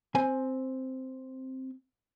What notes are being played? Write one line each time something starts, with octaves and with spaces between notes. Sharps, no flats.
C4 G#5